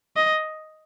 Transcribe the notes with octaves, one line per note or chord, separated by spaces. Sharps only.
D#5